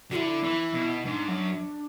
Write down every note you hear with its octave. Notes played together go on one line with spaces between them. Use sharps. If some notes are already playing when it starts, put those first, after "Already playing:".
D3 E4 F#4
E3
B2
G#2 D4
F#2